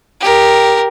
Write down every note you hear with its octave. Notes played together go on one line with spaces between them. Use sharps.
G4 A#4